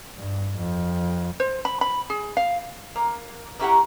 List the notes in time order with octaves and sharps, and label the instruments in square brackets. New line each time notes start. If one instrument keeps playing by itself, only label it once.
[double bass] G2
F2
[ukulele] C5
B5
B5
G#4
F5
[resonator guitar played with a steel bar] A#3
A#3 C#4 E4 G4 A#4 F#5